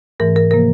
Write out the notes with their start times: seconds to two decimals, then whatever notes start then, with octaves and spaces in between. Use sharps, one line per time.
0.20 G#2 E3 A3 A#4
0.36 A#4
0.51 C3 F3 A#3 A#4